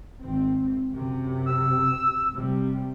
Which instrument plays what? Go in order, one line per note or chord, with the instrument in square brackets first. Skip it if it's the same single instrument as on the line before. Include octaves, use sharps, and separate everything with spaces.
[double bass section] G#1 C4
F#2 C3
[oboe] E6
[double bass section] C3 G3